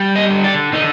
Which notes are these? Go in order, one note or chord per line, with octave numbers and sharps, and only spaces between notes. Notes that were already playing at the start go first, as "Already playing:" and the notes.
Already playing: G3
D#5
D3
D5
D3 D#4